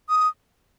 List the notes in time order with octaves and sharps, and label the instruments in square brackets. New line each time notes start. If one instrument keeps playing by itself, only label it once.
[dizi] D#6